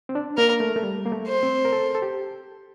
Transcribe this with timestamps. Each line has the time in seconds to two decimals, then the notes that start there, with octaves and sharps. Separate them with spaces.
0.09 C4
0.15 D4
0.37 A#3 A#4
0.60 A3
0.76 A3
0.83 G3
1.06 A#3
1.12 A3
1.28 C5
1.43 C4
1.65 A#4
1.72 A4
1.95 A4
2.02 G4